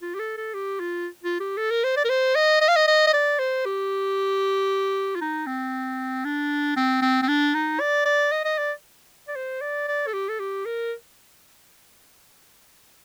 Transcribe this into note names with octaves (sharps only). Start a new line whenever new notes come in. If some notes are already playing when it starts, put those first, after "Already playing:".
F4
G4
A4
A4
G4
F4
F4
G4
A4
A#4
C5
D5
A#4
C5
D#5
D#5
F5
D#5
D#5
D#5
D5
C5
G4
F4
D#4
C4
D4
C4
C4
C4
D4
D#4
D5
D5
D#5
D#5
D5
D5
C5
D5
D5
A4
G4
A4
G4
A#4